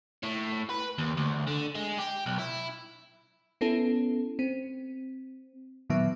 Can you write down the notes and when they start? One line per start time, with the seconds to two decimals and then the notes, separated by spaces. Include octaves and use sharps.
0.23 A2
0.70 B4
0.98 D#2
1.17 D2
1.47 D3
1.75 G#3
1.98 G4
2.26 B1
2.39 E4
3.61 B3 C#4 E4 A4
4.39 C4
5.90 A#2 D#3 F#3 B3 E5